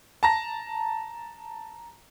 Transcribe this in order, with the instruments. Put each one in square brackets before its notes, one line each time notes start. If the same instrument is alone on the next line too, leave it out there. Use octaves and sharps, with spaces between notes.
[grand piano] A5 A#5 A#6